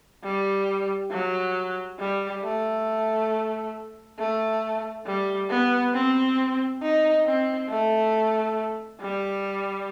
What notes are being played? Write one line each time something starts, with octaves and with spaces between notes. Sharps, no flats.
G3
F#3
G3
A3
A3
G3
B3
C4
D#4
C4
A3
G3